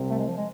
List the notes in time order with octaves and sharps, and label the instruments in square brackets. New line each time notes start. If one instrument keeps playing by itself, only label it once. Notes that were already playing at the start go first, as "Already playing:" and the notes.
Already playing: [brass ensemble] C2 C3
[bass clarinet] A3
G#3
F3
G#3